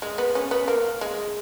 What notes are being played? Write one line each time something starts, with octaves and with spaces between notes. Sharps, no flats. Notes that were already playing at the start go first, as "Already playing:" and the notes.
G#3
B3
C#4
B3
A#3
G#3